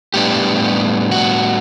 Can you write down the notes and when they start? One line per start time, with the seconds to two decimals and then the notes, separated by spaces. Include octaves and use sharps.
0.14 A2 G3 B3 D4 G4
1.11 F#4